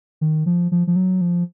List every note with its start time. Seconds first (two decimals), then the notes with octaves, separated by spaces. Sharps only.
0.21 D#3
0.46 F3
0.72 F3
0.87 F3
0.96 F#3
1.21 F3